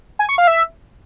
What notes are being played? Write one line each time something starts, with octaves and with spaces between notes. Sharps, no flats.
G#5
C#6
F5
E5